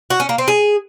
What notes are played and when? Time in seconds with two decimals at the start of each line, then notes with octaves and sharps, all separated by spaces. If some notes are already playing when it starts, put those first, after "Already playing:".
0.10 F#4
0.20 C#4
0.29 A#3
0.38 C4
0.48 G#4